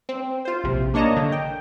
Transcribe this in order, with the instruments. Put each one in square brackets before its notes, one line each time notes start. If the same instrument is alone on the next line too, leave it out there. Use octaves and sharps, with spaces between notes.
[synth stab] C4
F4 C5
A#1 C3
A#3 D4 C#5 D#5 A5 A#5
D3
G5